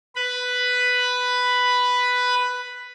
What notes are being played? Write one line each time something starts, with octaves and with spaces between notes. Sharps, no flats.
B4 B5